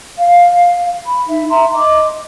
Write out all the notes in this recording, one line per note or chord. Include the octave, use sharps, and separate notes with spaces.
F5
B5
D#4 E5
E5 A#5 C6
D#5 D6